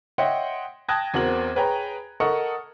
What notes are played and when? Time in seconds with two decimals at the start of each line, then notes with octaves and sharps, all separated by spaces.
0.18 C#5 D#5 E5 F#5 G5 C6
0.89 G5 A5 D#6 F#6 G#6 A#6
1.14 E2 C4 F#4 A#4 F#7
1.56 G#4 B4 C#5 G5 G#5 A#5
2.20 A4 A#4 D#5 F#5 C#6 D#6